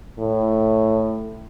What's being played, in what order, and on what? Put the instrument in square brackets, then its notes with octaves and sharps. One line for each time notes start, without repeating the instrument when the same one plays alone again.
[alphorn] A2